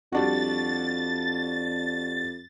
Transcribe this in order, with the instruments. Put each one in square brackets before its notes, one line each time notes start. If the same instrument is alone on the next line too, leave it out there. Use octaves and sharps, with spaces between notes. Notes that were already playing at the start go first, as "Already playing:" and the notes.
[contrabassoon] F2 [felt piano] G3 D4 F#4 [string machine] A6